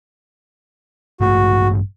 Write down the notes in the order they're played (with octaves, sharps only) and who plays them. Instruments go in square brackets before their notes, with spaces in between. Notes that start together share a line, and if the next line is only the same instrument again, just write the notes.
[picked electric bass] A1 G2 A3 [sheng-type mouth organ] F#4